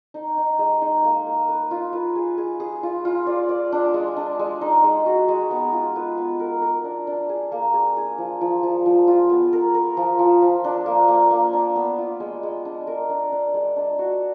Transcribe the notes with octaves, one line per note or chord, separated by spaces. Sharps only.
D#4
D#4
G#3
D#4
A#3
A#3
B4
F4
B4
G#4
G#4
G#4
F4
F4
D5
D5
D4
G#3
D4
G#3
D#4
G#3
F#4
G#3
B3
F4
B4
B3
A#4
A#4
D4
D4
G#4
A#3
G#4
G#4
F3
F3
F3
F3
F4
B3
A#4
A#4
F3
F3
F3
D4
A#3
A#3
A#3
D4
B3
F4
G#3
G#3
D4
A#4
D4
D4
G#3
D4
F#4